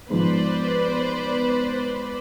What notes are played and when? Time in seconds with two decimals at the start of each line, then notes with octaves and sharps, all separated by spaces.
0.10 G#2 F3 B3 B4 C5 D5